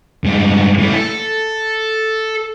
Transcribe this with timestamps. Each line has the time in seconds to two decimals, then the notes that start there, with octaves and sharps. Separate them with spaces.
0.24 G2 G#3
0.78 E3 A3
0.93 A4